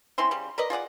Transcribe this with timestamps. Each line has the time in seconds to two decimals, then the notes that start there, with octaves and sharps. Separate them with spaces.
0.18 C4 C#4 E4 C6
0.31 C#3 G3
0.58 A#4 B4 D5 D#5
0.70 F4 G#4 D5 F#5